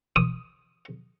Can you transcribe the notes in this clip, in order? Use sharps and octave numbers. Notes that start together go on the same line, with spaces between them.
D#6